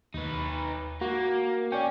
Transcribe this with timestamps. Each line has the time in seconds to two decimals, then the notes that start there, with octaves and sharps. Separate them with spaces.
0.14 D#2 D#4 B4
1.01 A#3 F#4
1.72 C#4 D5 G5